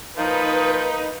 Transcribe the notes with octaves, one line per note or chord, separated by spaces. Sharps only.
F3 A#3 D#4 B4